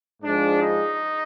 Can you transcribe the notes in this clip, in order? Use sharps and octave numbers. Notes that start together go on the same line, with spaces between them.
G#2 F3 G#3 D4
D#4